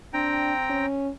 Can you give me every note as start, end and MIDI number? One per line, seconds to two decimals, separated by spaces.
0.13 0.86 60
0.13 0.53 62
0.13 0.86 79
0.13 0.86 82
0.70 1.10 61